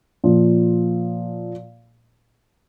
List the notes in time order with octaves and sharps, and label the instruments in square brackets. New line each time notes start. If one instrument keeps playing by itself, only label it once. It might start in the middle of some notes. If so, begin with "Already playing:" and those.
[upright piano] A#2 F3